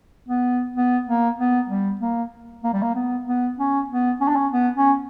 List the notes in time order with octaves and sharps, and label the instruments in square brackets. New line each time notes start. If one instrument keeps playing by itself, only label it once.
[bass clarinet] B3
B3
A#3
B3
G3
A#3
A#3
G3
A#3
B3
B3
C#4
B3
C#4
D4
C#4
B3
C#4